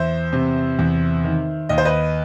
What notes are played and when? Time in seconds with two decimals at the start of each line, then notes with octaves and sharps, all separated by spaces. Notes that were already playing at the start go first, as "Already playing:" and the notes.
Already playing: E2 C5 E5
0.33 C3
0.79 E2
1.24 D#3
1.69 D#2 D#5
1.78 C5
1.85 B4 D#5